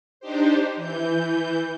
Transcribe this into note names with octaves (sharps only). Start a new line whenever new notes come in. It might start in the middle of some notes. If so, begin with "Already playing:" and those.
D4 D#4 G4 C5
E3 G6